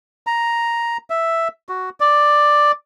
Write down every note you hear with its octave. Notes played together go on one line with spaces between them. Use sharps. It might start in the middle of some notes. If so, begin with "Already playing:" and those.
A#5
E5
F#4
D5